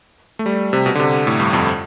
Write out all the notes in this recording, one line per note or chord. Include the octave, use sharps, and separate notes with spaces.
A3
G3
C3
B2
D3
C3
A2
G2
F2